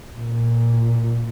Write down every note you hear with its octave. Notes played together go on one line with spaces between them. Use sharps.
A#2